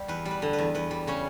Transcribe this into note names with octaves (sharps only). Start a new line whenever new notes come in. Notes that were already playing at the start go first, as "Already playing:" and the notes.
Already playing: G3 G4
E2 B4
G3
B4
D3
B4
E2
E2 B4
G3
C#3 C#4